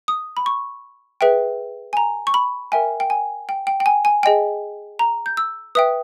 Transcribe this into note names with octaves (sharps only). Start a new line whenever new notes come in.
D#6
B5
C#6
G#4 B4 E5 G5
G#5
A#5
C#6
B5
A#4 E5 G5 G#5
G5
G#5
G5
G5
G5
G#5
G#5
G#4 D#5 G5 G#5
A#5
G6
E6
B4 E5 G5 D#6